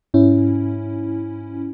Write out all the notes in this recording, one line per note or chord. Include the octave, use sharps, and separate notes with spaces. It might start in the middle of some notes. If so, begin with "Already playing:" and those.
G#2 C#4 E4